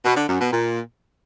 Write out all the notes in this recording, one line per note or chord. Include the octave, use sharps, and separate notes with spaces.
B2
D3
F#2
B2
A#2